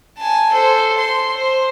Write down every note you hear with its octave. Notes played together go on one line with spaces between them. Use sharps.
G#5 A5
A4 C5
C6
C5